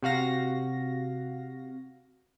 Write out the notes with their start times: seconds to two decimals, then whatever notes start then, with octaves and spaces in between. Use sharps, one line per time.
0.02 C3 F#4 F5 A#6